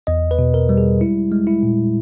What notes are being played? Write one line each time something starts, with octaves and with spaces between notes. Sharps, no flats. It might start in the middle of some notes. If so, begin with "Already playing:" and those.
E2 D#5
B4
B2
A#4
G3
G#4
G#3 E4
G#3
E4
A#2